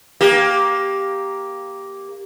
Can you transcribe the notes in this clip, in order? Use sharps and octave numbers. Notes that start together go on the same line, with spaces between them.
A#3 G4